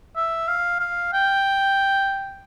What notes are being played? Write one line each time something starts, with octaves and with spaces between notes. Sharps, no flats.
E5
F5
F5
G5